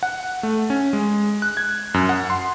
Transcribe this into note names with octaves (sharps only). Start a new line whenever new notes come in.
F#5
A3
C#4
G#3
F#6
G#6
F#2
F#5
C6